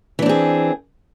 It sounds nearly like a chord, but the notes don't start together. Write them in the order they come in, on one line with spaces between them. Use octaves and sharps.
E3 D4 C4 G#4